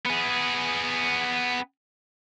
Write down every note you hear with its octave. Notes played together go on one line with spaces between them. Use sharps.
B3 G#4